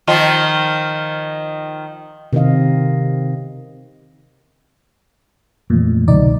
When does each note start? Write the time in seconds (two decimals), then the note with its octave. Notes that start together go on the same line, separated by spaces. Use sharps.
0.07 D#3 F3 F4
2.33 C3 D#3 C4 D#4 D#5 F5
5.70 F2 A#2 E3 A3 A#3
6.08 C2 B2 D3 F#3 D#4 D5